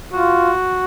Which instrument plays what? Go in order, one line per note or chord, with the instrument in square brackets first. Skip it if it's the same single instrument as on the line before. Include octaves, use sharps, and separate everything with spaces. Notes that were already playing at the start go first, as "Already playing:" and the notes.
[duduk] F4 [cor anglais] F#4